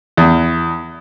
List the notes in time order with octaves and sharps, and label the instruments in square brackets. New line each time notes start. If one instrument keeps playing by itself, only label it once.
[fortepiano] E2